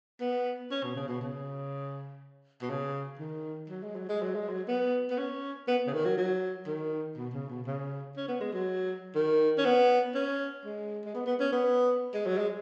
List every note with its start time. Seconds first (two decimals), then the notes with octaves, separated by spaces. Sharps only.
0.20 B3
0.71 C#4
0.83 B2
0.96 C#3
1.08 B2
1.21 C#3
2.62 B2
2.70 C#3
3.19 D#3
3.69 F#3
3.83 G#3
3.95 F#3
4.09 G#3
4.22 F#3
4.35 G#3
4.49 F#3
4.68 B3
5.10 B3
5.18 C#4
5.68 B3
5.87 C#3
5.93 D#3
6.05 F#3
6.18 F#3
6.67 D#3
7.17 B2
7.34 C#3
7.50 B2
7.66 C#3
8.17 C#4
8.28 B3
8.41 G#3
8.53 F#3
9.15 D#3
9.58 C#4
9.65 B3
10.15 C#4
10.65 G#3
11.05 G#3
11.15 B3
11.26 B3
11.40 C#4
11.52 B3
12.14 G#3
12.26 F#3
12.38 G#3